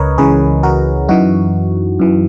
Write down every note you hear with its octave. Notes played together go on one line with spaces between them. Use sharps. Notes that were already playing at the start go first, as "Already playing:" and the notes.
Already playing: C#2 C#3 A#4 B4 C#5 D#5
C#2 C#3 E3 G#4 B4
F#4 A#4
F#2 E3 D#4 F#4
F#2 E3